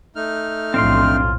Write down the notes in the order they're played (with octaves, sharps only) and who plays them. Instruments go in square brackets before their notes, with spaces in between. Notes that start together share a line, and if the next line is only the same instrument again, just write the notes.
[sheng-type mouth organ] A3 D#4 F6
[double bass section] B1 F2 A2 [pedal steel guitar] C4 D4 C6 [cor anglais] F4